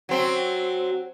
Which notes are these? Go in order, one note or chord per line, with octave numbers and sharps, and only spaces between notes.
F#3 C4